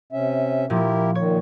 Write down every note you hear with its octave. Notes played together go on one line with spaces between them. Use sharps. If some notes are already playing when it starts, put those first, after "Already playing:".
C3 C#4 E5
A#2 F3 E4 G4 A#4
A#2 D#3 C#5